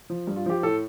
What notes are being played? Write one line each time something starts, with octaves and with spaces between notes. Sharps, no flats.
F3
G2
F4
F3 G4
A2 A4